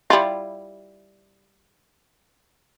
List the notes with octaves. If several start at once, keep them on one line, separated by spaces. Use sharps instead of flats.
G3 E4 F4